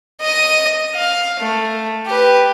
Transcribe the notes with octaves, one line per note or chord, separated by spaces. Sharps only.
D#5 D#7
F5
A3
G4 B4